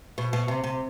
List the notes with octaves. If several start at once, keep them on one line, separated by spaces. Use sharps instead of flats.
B2
B2
C3
C3